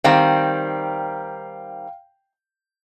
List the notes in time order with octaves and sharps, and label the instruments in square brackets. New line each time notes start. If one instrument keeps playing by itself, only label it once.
[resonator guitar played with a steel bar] D#3 G3 C4 [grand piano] F5 G5